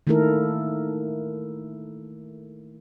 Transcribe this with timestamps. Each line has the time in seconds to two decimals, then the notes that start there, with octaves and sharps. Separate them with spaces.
0.07 D#3 A3 A#3 E4 A4 A#4